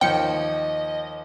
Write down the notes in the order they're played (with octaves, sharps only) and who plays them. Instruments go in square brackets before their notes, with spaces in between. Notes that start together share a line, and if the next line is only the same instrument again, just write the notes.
[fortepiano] D#2 F3 [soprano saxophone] D#5 [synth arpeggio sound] G5 C#7